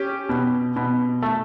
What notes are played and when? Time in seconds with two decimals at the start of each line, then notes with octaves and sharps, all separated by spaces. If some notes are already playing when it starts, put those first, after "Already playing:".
Already playing: C#4 G4
0.29 B2
0.76 B2
1.22 A3